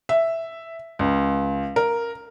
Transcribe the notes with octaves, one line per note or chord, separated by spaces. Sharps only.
E5
C#2
A#4